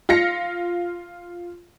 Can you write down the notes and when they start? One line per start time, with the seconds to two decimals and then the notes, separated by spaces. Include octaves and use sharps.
0.09 F4 F5 A#6 C#7